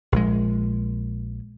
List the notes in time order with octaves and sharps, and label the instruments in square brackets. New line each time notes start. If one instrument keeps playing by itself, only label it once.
[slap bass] A#1 G#3